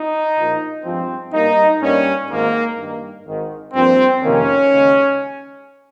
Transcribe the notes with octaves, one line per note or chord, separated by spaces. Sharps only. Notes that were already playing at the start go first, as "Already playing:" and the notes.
Already playing: D#4
A#1 A#2 F3 A#3
G2 F3 G#3 C4
G2 G3 A#3 D#4
G2 G3 A#3 C#4
G#1 G#2 D#3 G#3 A#3
G2 D#3 A#3
G#1 G#2 D#3
G2 F3 A#3 C4
F2 C3 D#3 A#3 C#4
D#2 C#3 G#3